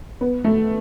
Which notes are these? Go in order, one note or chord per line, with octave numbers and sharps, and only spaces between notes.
B3
A3